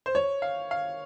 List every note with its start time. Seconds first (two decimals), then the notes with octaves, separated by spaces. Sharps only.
0.06 C5
0.15 C#5
0.42 F5
0.71 F5